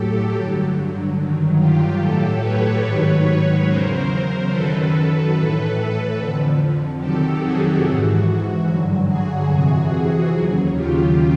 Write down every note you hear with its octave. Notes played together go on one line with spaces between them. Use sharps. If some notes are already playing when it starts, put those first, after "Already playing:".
Already playing: A2 F#3 G4 A4
G2 D3 F#3
G2 D#3 F#3
F4 G4
A2 F#3 G4 A4
B4 C#5
G#2 D#3 F#3
E2 C#3 F#3 A#4 C5
F#2 D#3 F#3 A4 B4
A2 E3 A4 B4
A4 B4
F2 D3 F3
F2 C3 D#3 F#3 G4 A4
F#4 G#4
G#2 E3 F#4
G2 D3 F#3
F#4 G#4
F2 C3 E3 F#4 G#4
D#2 C#3 F#3
F4 G4